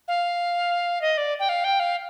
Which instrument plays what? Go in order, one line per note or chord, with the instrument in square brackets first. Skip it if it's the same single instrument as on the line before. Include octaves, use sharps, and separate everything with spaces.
[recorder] F5
D#5
D5
G5
F5
G5
F5